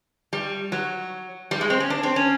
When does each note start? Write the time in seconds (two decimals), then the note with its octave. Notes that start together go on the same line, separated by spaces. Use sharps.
0.33 G3
0.72 F#3
1.51 G3
1.61 G#3
1.70 C4
1.80 C#4
1.90 D4
2.03 C4
2.16 C#4